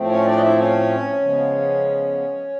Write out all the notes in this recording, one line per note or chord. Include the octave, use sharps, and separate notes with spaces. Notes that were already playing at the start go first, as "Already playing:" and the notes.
Already playing: A2 F3 A3 C4
C#4 C#5
D4 D5
D#5
E4 E5
C#4 C#5
C#3 F3 G#3 B3